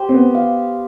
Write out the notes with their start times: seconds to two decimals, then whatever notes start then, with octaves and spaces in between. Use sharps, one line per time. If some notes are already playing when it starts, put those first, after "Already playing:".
Already playing: G4 C5
0.09 C4
0.14 B3
0.35 F5